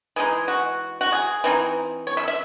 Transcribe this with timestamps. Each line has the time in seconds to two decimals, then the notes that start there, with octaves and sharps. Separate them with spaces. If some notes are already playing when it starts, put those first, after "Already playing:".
0.16 E3 G#3 D#4 G#4
0.48 F#4
1.01 F#4
1.12 G#4
1.44 E3 C4 D#4
2.07 C#5
2.17 E5
2.28 E5